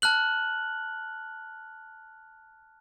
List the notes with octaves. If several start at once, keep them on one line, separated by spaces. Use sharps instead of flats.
A5 F6 F#6 F#7